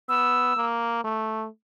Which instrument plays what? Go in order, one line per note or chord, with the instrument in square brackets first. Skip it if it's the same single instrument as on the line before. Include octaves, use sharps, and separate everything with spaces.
[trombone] B3 [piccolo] E6
[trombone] A#3
A3